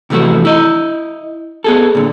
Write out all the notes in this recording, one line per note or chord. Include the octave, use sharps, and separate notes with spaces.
C3 E3 F3 A3 F#4
E4 D#5
B3 G#4 A4
A#2 D3